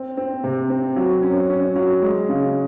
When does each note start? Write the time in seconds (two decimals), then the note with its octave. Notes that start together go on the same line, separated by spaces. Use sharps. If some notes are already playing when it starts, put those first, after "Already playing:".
Already playing: C4
0.17 C4
0.44 C3
0.70 C4
0.97 F#3
1.23 C#4
1.50 C#4
1.76 F#3
2.02 G#3
2.29 C#3